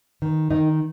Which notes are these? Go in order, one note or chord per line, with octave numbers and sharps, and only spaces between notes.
D#3
D#3 D#4